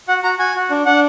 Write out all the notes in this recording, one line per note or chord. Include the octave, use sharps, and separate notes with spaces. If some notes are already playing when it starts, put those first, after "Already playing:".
F#4 F#5
F#4 A#5
F#4 G#5
F#4
D4
D4 F#5